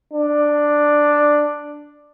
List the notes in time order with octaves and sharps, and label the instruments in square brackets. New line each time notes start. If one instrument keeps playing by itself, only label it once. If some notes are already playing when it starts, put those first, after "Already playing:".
[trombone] D4